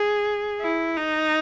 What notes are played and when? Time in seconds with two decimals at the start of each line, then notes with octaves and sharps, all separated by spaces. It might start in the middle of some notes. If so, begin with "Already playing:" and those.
Already playing: G#4
0.61 E4
0.97 D#4